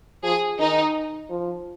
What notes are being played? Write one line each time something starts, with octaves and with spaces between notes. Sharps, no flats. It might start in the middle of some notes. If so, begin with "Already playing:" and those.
F3 G#4
D#3 D#4
F3